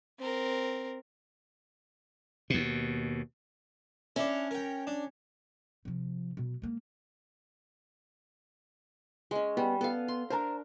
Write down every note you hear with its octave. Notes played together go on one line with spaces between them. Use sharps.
C4 A#4
D#2 B2
C#4 D4 E4
A#4 G5
D4
C3 F3
B2 F#3
G#3 A#3
G#3 C#4
G3 B3
B3 A4 F5
C6
D4 A#4 C5 A5 A#5